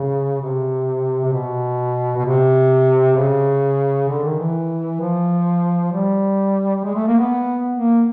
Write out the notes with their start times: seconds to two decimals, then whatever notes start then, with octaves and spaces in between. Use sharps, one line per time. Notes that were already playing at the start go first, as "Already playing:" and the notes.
Already playing: C#3
0.42 C3
1.24 C3
1.33 B2
2.17 B2
2.25 C3
3.17 C#3
4.09 D3
4.24 D#3
4.40 E3
5.01 F3
5.92 G3
6.84 G#3
6.95 A3
7.07 A#3
7.19 B3
7.76 A#3